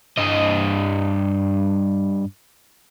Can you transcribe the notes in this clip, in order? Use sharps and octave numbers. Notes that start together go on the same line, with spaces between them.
G2 D#5